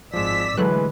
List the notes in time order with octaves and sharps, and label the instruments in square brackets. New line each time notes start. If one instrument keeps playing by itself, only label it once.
[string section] G#1 E6 B6 [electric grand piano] F3 G#3 [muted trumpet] D5
[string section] D3 [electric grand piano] E3 G#3 [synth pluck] F#3 A3 F#6 [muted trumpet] B4